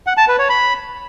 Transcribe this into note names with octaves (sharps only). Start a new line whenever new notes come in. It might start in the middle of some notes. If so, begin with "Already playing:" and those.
F#5
A5
B4
C#5
B5